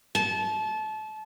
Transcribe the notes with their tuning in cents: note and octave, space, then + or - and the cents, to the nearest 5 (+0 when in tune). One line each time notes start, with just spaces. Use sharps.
A5 -25